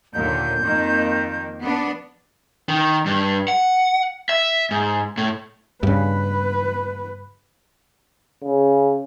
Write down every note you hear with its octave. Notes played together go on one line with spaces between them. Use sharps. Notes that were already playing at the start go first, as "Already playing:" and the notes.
D#2 A#2 D3 G6
F2 D#3 A#3
B3 D4
D#3
G2
F#5
E5
G#2
A2
G2 C#3 B4
C#3